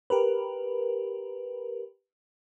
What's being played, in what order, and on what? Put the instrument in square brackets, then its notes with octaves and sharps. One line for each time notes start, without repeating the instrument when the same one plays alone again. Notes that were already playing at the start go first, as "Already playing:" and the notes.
[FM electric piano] G4 A#4 B4